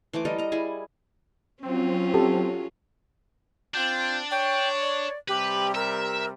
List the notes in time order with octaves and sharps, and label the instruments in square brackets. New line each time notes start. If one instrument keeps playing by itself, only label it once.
[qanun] E3 A3 C5 D6
G3 A4 A#4 D#5
D#5 A#5
G3 E4 G#4
[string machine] F#3 [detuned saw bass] C4 [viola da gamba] C#4 F4
[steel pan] G4 A4
[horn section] C4 F4 G5 [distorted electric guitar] D4 [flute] G6
[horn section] C#5 [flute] G5
[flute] D5
[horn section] C3 G3 [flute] G4 [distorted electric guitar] B4
[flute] A#4 [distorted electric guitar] E5